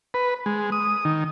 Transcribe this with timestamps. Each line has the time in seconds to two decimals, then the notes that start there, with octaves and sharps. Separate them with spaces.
0.14 B4
0.46 G#3
0.72 D#6
1.05 D#3